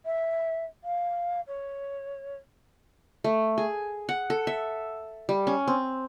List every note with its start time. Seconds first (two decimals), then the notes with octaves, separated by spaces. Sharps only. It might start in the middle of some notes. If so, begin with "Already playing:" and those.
0.05 E5
0.84 F5
1.47 C#5
3.24 A3
3.58 G#4
4.09 F#5
4.30 A4
4.47 E5
5.29 G3
5.47 C#4
5.67 C4